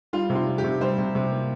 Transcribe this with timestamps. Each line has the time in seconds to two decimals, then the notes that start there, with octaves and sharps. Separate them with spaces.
0.13 G3 F4
0.30 C3
0.35 F4
0.47 G3
0.58 G4
0.64 C3
0.80 G3 C5
0.98 C3
1.15 C3
1.32 A#3